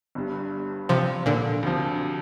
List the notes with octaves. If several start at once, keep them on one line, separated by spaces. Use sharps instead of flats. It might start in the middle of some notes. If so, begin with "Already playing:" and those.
G1 G2 G3
C3 F3
A#2 D3
D2 C3 F3